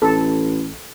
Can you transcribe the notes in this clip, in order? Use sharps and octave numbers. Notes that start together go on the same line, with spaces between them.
A1 A4